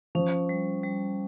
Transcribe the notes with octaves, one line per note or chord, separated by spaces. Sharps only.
F3 C#4
G3
G3